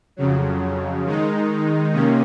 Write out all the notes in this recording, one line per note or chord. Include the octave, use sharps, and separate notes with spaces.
F2 C#3 F#3
D#3 G#3 D#4
C3 D#3 A#3 C#4